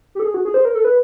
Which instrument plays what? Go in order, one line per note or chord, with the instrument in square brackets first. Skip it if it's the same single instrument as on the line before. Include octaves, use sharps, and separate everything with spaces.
[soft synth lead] G4
A4
G#4
F#4
G#4
C5
A#4
A4
B4